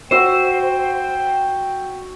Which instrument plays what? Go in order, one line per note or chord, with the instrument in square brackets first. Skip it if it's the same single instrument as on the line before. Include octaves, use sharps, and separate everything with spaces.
[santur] F#4 E5 F#5 [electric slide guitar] C5 [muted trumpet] G5